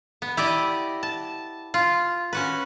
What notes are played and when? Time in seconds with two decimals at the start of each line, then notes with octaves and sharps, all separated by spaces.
0.22 B3
0.37 E4 G4 D5 D#5
1.03 A5
1.74 F4
2.33 C#4 F#4 B4